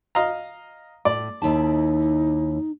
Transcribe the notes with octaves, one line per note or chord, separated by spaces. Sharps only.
D#5 F5 A#5
A2 D5
D#2 D#4 E4 A5